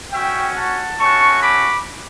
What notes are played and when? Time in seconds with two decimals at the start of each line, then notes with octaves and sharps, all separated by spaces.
0.12 C#4 F#4 E5 G5
0.55 F#5 A5
0.99 A3 C#4 F#4 A5 C#6
1.42 B5 D6